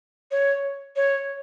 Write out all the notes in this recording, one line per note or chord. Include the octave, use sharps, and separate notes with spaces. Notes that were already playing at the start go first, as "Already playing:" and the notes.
C#5
C#5